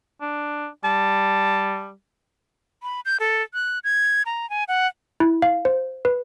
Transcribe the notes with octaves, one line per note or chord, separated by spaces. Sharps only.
D4
G3 A5
B5
G6
A4
F#6
G#6
A#5
G#5
F#5
E4
F5
C5
B4